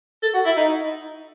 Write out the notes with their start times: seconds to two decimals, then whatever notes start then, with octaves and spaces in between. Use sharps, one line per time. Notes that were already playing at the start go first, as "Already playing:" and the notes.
0.23 A4
0.34 F#4
0.45 E4
0.57 D#4